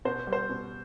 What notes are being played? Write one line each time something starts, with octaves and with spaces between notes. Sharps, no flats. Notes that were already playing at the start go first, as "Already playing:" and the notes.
B2 C5
G3
C5
B2